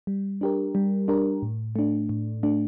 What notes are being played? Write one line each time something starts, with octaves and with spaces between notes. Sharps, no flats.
G3
D4 G4 A#4
G3
D4 G4 A#4
A2
A3 D4
A2
A3 D4